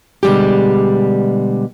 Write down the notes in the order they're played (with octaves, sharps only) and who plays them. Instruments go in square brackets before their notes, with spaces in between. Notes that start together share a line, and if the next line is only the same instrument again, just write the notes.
[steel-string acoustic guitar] B2 D3 G3 G#3 G4